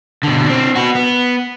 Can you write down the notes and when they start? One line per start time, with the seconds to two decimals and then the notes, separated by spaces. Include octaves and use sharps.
0.23 B2 D3
0.46 C4 D4
0.76 B3 F#4
0.95 B3